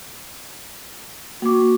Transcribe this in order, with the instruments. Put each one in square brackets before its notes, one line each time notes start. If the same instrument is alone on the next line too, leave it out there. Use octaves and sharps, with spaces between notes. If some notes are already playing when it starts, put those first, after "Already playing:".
[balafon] A#3 D6 [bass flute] F#4